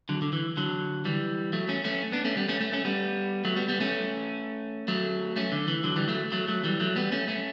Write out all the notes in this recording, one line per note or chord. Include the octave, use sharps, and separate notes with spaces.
D3 F#3
D3
E3
D3 F#3
E3 G3
F#3 A3
A3 C#4
A3 C#4
B3 D4
A3 C#4
G3 B3
A3 C#4
A3 C#4
A3 C#4
G3 B3
F#3 A3
G3 B3
G3 B3
A3 C#4
F#3 A3
A3 C#4
D3
E3
D3 F#3
E3 G3
F#3 A3
F#3 A3
F#3 A3
E3 G3
F#3 A3
G3 B3
A3 C#4
A3 C#4